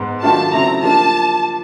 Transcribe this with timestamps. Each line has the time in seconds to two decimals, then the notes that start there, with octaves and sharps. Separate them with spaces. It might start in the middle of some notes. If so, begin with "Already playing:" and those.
Already playing: G#2 B3
0.23 D#3 F#3 A3 D4 F4 A5
0.53 C#3 F#3 A3 C4 E4 A#5
0.83 F3 A#3 D4 G4 A5